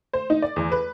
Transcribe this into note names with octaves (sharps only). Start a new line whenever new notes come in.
C5
D#4
D5
E2
B4